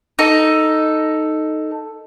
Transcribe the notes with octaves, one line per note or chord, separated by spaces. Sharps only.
D#4 A4